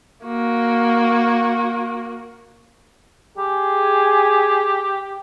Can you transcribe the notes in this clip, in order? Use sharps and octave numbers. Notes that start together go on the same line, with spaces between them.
A#3 F#4
G4 G#4